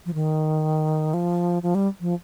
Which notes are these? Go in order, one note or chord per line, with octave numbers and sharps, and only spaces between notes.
F3
D#3
F3
F3
G3
F3